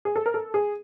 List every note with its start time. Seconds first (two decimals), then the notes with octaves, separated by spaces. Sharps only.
0.05 G#4
0.16 A4
0.26 A#4
0.34 A4
0.54 G#4